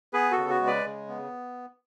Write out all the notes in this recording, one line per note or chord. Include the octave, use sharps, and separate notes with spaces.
B3 G#4 B4
F#4 A4
C#3
F#4
G#3
B4 D5
C#3
B3